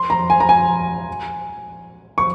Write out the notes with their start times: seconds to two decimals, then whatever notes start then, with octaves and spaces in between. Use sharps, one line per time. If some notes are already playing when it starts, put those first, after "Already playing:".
Already playing: C6
0.10 A#5
0.30 G#5
0.40 A#5
0.49 G#5
2.18 C#6